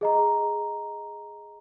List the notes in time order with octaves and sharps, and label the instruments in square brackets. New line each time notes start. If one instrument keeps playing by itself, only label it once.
[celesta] G#4 D#5 A#5